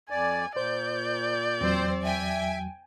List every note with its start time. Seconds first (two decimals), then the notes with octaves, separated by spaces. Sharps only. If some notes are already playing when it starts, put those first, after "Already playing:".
0.10 F2 D5 G#5
0.56 A#2 C5 D5 G6
1.61 E2 F#3 C4 C5
2.04 E5 G5 G#5 G#6